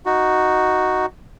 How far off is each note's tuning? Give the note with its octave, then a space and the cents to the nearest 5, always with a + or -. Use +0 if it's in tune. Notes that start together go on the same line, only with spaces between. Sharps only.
D#4 +0 F#4 +0